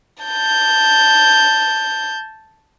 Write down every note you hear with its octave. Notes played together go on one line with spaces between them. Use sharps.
A5 G6